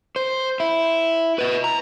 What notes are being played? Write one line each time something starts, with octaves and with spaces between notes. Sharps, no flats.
C5
E4
B4 D#5
A#5